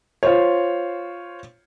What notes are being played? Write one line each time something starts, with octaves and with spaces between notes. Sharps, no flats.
F4 C5 C#5